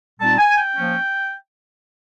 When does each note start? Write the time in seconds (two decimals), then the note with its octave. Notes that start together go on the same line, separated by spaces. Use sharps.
0.20 A#2 G3 C4 D#4 A5
0.38 G#5
0.56 G5
0.75 F3 A#3 C#4